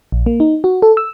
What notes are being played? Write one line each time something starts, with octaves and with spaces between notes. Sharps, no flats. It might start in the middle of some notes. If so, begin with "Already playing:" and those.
A#1
A#3
D#4
F#4
A4
E6